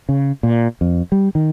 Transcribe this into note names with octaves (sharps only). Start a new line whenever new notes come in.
C#3
A#2
F2
G3
D#3